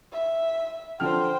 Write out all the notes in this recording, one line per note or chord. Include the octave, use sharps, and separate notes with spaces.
E5
D3 F3 C5 G5 F6